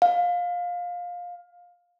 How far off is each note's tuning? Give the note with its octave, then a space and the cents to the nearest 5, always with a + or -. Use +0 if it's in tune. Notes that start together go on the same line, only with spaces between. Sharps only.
F5 +20